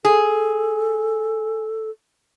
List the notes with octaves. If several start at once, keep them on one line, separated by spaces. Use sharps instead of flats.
G#4 A4